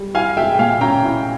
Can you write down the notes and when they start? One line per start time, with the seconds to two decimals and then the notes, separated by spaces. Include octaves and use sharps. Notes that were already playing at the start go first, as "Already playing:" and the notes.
Already playing: G3
0.15 E4 F5 G#5
0.37 G#3 E5 G5
0.54 G5
0.59 A#2 F5 G#5
0.81 C#4 G5 A#5
1.03 E4